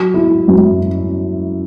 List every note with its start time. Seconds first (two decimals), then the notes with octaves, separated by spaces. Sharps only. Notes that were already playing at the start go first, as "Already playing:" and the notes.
Already playing: F#3
0.14 E4
0.48 F#2